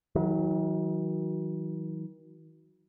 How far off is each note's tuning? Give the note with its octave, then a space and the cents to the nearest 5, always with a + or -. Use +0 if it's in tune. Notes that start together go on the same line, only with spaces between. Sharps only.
D#3 +45 F#3 +0